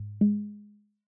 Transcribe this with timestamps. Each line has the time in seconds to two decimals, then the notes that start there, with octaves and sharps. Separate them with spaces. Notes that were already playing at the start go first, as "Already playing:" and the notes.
Already playing: G#2
0.21 G#3